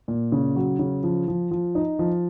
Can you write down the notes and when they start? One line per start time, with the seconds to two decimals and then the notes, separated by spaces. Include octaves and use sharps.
0.08 A#2
0.32 C#3
0.56 F#3
0.79 C#3
1.04 F3
1.28 F3
1.51 F3
1.75 D#4
1.99 F3